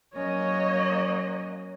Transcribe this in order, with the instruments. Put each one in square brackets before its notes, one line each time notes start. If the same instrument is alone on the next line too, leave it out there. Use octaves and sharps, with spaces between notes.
[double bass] F#3 A#3 [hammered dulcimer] C#4 [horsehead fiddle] C#5 D#5